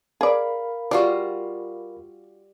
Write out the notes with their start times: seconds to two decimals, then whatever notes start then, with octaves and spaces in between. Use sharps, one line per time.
0.21 G#4 A#4 D5 F5 B5
0.91 G3 F4 F#4 D5